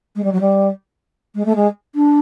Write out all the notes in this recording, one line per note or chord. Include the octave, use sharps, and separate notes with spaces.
G#3
G3
F#3
G3
G#3
A3
G#3
D4